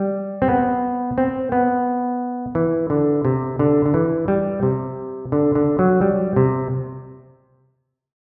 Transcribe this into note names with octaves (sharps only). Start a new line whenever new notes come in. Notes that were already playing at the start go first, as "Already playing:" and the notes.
Already playing: G3
C4
B3
C4
B3
E3
D3
C3
D3
D3
E3
G3
C3
D3
D3
F#3
G3
C3